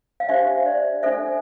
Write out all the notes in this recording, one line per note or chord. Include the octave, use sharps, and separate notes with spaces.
F5
D4 G4 C5 E5
D5
D4 A4 C5 E5